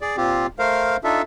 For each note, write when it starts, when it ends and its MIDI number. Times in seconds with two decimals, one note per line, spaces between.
0.01 0.16 68
0.01 0.16 74
0.17 0.47 46
0.17 0.47 60
0.17 0.47 65
0.17 0.47 67
0.59 0.97 57
0.59 0.97 70
0.59 0.97 72
0.59 0.97 77
1.04 1.22 62
1.04 1.22 63
1.04 1.22 65
1.04 1.22 69
1.04 1.22 76